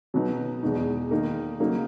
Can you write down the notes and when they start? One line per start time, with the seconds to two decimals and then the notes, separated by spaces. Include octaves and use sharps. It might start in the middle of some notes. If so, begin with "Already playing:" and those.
0.14 B2 F#3 B3 D#4
0.63 E2 B2 G#3 D#4
1.11 D#3 A#3 D#4
1.59 C#3 F#3 A#3 D#4